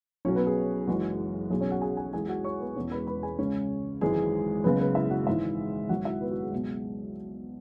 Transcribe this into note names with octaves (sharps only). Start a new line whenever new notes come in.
B1 B2 F#3 C#4 C#5
B3 B4
G#4
F#1 F#2 E3 G#3 F#4
B1 B2 F#3 G#4
C#4 C#5
F#4 F#5
G#4 G#5
G#4 G#5
E2 E3 G#3 G#4 G#5
F#4 F#5
C#5 C#6
B3 B4
E1 E2 B2 G#3 C#4 C#5
B4 B5
B4 B5
G#4 G#5
C#2 C#3 G#3 C#4 C#5
G#1 F#2 E3 G#3 G#4
F#1 F#2 C#3 G#3 B3 B4
B3 B4
E4 E5
F#4 F#5
G#1 G#2 E3 G#3 E4 E5
G#1 F#2 F#3 F#4 F#5
E4 E5
B3 B4
F#4
G#4
C#2 B2 F#3